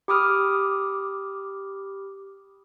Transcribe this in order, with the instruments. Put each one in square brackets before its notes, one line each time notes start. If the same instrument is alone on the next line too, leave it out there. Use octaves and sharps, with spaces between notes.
[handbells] G4 B5 D6 D#6 F6